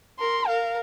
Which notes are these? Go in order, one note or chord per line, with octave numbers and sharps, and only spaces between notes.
A#4 C6
A#4 F5